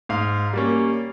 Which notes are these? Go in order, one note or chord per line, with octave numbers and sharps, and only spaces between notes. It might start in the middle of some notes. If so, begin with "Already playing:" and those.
G#2 F5
G3 A#3 C#4